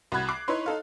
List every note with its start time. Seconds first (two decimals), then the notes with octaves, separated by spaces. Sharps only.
0.12 C2 F#4 B5 F#6 G#6
0.28 D6 F#6 C7
0.48 D#4 E4 B4 C#5 C6
0.66 D#4 A4 F5